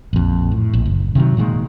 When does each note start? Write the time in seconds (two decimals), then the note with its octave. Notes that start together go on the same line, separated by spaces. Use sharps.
0.13 A#1 F2
0.52 A2
0.74 A#1
0.85 F#1
1.15 C3 D#3 F#3
1.37 A#2 D#3 F#3 G#3